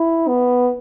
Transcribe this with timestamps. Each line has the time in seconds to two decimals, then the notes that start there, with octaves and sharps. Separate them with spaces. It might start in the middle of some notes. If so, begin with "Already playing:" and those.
Already playing: E4
0.28 B3